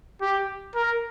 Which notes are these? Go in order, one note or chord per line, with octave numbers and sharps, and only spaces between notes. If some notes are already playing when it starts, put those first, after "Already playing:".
G4
A#4